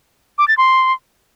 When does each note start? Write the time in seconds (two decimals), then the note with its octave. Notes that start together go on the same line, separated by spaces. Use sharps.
0.38 D6
0.48 A6
0.57 C6